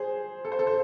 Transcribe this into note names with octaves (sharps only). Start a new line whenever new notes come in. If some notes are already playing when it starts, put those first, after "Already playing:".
Already playing: G#4 C5
A4
C5
A4
C5